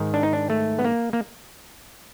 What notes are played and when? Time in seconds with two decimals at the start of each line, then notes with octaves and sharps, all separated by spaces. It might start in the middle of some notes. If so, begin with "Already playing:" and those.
Already playing: G#2 D#3
0.14 D4
0.23 D#4
0.33 D4
0.50 A3
0.79 B3
0.85 A#3
1.13 A#3